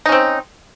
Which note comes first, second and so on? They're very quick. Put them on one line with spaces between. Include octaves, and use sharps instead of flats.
D#4 C#4 C4